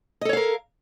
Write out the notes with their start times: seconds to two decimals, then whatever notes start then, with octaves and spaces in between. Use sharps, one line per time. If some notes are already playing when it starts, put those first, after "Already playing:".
0.21 D#5
0.25 A4
0.29 C#5
0.33 F5
0.37 A#4